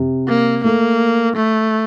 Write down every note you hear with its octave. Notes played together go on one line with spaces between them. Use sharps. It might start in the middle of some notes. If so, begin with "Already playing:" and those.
Already playing: C3
A#3
A3 A#3
A3